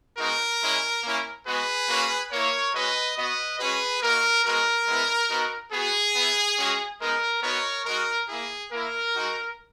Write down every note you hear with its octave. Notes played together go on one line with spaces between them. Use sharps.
G#3 B3 D#4 F#4 A#4
G#3 C#4 E4
A#3 C#4 E4
G#3 B3 F#4 G#4 B4
A#3 C#4 F#4
A#3 E4 A#4 C#5
G#3 C#4 F#4 B4 D#5
B3 F#4 B4 D#5
G#3 C#4 F#4 G#4 B4
A#3 D#4 F#4 A#4
G#3 B3 F#4 A#4
G#3 B3 E4
B3 D#4 F#4
B3 F#4 G#4
B3 E4
G#3 C#4 F#4
G#3 B3 D#4 A#4
B3 D#4 F#4 A#4 C#5
G#3 D#4 F#4 A#4
A#3 E4 G#4
A#3 E4 A#4
G#3 D#4 F#4